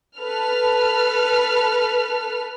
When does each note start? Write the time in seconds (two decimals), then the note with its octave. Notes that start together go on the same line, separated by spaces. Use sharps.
0.19 A4 B4 F6